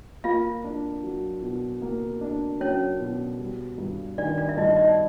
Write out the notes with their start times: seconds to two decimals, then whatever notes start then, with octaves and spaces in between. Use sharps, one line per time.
0.24 A#3 F4 F5
0.64 D4
1.03 F#3
1.42 B2
1.82 A#3
2.21 D4
2.60 F#3 C#4 C#5
3.00 B2
3.39 G3
3.78 G2
4.18 D#3 D4 D5
4.38 D4 D5
4.49 E5
4.57 G2 D#4 D#5
4.76 D#4 D#5
4.89 D5